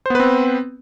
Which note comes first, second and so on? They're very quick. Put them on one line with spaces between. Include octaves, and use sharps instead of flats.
C5 B3 B4 C4